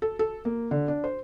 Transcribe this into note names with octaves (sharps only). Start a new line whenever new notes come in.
A4
A4
A#3
D3
D4
C5